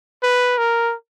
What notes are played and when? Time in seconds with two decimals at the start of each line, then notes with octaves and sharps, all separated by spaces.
0.23 B4
0.58 A#4